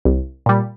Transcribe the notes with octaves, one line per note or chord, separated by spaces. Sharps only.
C2
A#2 G3